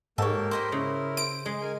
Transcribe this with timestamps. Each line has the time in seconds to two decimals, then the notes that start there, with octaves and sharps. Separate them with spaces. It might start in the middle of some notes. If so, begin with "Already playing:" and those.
0.18 G#2 A#3 G4 A4 A#4 C#5
0.51 C5 D#5 B5
0.72 C#3 E4 A#4
1.17 C5 D7
1.46 G#3 G#4
1.61 A#4 G#5